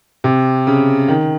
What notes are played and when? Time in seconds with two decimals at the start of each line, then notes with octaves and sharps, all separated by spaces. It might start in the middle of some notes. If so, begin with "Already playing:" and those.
0.24 C3
0.67 C#3
1.08 D#3